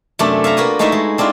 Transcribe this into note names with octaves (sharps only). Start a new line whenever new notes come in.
F#2 C3 A3 D4
E5 F5 A5 A#5
A#3 F4 F#4 B4 G#5
G#3 A3 D#4 E4 F#4 E5
G#3
C4 D4 E4 F4